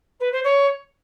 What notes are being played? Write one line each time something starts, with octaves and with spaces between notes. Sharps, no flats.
B4
C5
C#5